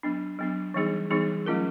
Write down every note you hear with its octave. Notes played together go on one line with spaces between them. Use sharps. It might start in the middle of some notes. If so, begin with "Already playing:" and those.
F#3 B3 D4
F#3 B3 D4
E3 G3 B3 D#4 G#4
E3 G3 B3 D#4 G#4
F#3 A3 C#4 F4 A#4